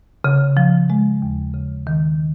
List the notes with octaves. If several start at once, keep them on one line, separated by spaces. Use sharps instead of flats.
C#3
F3
G#3
D#2
C#3
D#3